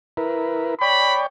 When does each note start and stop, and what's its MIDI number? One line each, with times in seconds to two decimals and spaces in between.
0.17 0.75 64
0.17 0.75 70
0.17 0.75 71
0.81 1.27 73
0.81 1.27 74
0.81 1.27 79
0.81 1.19 83